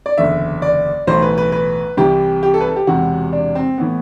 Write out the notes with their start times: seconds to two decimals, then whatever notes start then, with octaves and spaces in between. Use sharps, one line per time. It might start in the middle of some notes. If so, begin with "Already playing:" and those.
0.06 D5
0.17 F#1 E2 D3 E5
0.62 D5
1.07 B1 A2 E3 C5
1.22 B4
1.38 B4
1.52 B4
1.97 C2 C3 E3 G4
2.43 G4
2.54 A4
2.61 B4
2.65 A4
2.76 G4
2.87 E1 E2 C3 E3 F#4
3.33 D4
3.55 C4
3.78 A2 E3 B3